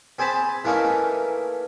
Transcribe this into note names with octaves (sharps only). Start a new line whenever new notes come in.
C4 G#4 C5 A5 B5
E3 A3 A#3 C#4 D#4